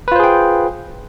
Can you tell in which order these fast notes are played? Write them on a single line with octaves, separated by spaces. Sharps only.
B4 F4 C5 G#4 G5